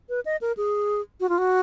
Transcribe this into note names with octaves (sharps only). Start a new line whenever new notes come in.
B4
D#5
A#4
G#4
F#4
F4
F#4